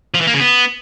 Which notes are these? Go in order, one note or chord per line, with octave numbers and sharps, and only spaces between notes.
F3
E3
A#3
C#3
B3